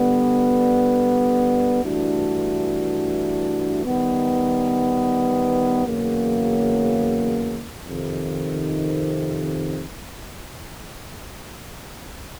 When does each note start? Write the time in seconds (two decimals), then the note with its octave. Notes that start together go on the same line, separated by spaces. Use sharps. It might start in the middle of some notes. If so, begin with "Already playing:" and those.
Already playing: D3 G3 B3
1.83 G2 E3 A3 D4 F#4
3.84 D#3 G3 B3
5.85 E2 C#3 F#3 A#3
7.87 F2 C3 D#3